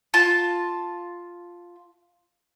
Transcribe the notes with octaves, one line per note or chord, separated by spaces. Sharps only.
F4 A5